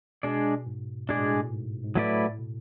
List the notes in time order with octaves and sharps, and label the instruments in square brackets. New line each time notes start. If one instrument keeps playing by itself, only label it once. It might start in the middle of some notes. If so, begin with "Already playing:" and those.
[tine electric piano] B2 [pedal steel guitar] G#3 D4 G#4 D5
[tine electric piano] G#2
[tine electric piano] A2 [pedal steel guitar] G#3 D4 G#4 D5
[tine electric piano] B2
A2
G#2
G#2
[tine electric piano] A2 [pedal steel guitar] F#3 A3 E4 B4 D5
[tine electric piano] A2
B2